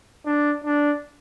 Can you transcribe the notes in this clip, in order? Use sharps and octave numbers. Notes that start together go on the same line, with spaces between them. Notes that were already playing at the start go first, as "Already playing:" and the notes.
D4
D4